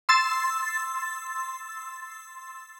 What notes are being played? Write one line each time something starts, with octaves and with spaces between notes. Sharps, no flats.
C6 E6 A6